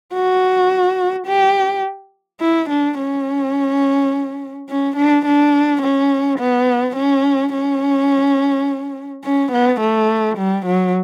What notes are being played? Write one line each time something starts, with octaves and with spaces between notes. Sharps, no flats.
F#4
G4
E4
D4
C#4
C#4
D4
D4
C#4
B3
C#4
C#4
C#4
B3
A3
G3
F#3